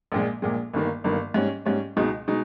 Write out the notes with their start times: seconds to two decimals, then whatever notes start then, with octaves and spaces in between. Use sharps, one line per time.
0.12 A#1 A#2 G#3
0.42 A#1 A#2 G#3
0.73 G1 G2 D#3 A#3
1.04 G1 G2 D#3 A#3
1.34 G#2 G3 C#4
1.65 G#2 G3 C#4
1.97 C#2 B2 G#3 D#4
2.28 B2 G#3 D#4